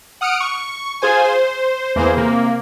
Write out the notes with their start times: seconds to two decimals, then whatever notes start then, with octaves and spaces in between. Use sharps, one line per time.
0.21 F#5 D#6 F6 C#7 D7
0.40 C#6
1.02 F4 G#4 C5 G#5
1.24 C5
1.95 E2 E3 A#3 G#4 C5
2.17 C3 A#3